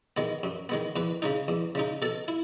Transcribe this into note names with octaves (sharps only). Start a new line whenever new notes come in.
D#3 G#3 B3
F#2
D#3 G#3 B3
E2 B4
C#3 G#3 D#4
E2
C#3 G#3 D#4
B2 A4
E4